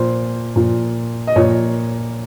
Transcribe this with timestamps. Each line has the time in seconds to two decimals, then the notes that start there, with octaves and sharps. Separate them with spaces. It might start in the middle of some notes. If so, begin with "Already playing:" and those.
Already playing: A#2 F3 C5
0.56 A#2 F3
1.27 D#5
1.36 A#2 F3 C#5